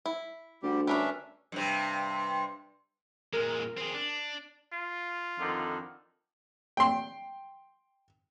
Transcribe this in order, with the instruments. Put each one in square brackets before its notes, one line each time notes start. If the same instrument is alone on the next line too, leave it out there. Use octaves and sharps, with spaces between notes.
[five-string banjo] E4
[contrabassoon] D2 [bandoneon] D3 G3 G4
[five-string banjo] G3 A#4 B4 [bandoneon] C#4 D4 E5
[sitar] G2 C3
[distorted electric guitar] A#2 G#3 [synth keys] A#4
[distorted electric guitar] C4 G#4
D4
[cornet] F4
[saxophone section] F2 D3 D#3
[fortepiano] G5 C6